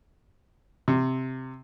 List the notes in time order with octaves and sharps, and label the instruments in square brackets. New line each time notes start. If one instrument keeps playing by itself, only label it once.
[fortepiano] C3